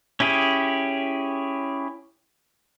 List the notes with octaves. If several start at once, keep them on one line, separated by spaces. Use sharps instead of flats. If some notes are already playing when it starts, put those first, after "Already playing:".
C#4 E4 G4 G#4